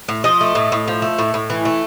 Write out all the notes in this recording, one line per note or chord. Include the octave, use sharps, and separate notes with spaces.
A2
F3 D#5
A3
A2
A2
F3
A3
A2
A2
E3
A3